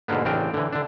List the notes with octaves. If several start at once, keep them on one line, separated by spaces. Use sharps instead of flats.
G#2 B2 D3 A#3 B3
A1 C#3 C4 D4 A#4 G5
D3 E3
D3 D4